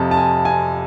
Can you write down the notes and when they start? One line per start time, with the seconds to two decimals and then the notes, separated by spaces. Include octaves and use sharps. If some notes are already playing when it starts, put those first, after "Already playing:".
Already playing: F2 C3 F3 A5
0.11 A5
0.17 G#5
0.45 G#5